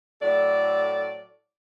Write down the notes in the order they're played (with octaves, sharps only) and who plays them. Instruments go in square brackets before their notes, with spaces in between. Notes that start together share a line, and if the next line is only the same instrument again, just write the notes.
[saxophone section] A2 F#3 A4 D5